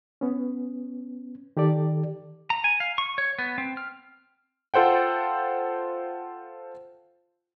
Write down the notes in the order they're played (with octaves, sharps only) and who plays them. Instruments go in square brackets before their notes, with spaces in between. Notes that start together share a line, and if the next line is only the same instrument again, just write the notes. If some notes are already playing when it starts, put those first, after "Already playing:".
[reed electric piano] B3 C#4
D#3 G4 A4 D5
[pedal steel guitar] A#5
G#5
F5
C#6
C#5
B3
C4
F6
[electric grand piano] F4 A4 C5 F#5 G5